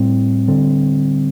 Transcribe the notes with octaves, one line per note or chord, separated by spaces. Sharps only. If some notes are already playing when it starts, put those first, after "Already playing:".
Already playing: A2 G3 C4
D3 G3 C4